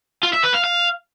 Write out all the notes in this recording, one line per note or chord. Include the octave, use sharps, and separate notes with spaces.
F4
E5
B4
F5
F5